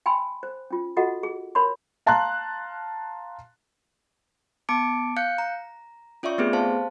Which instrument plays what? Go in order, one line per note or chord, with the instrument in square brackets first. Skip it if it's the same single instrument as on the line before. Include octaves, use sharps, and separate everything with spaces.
[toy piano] G5 G#5 B5 C6 E6
C5
C#4 F4
F4 F#4 A4 D#5 F#5
G#4
A#4 C#5 B5 C6
[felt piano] F5 A5 A#5 C6 F#6
[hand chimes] B3 A5 D6 C#7 D7
F5 F#6 G6 C#7
A#5
C#4 F4 D5 E5 C#6
A3 B3 C4 G4 G#4 B4
C5 F5 A5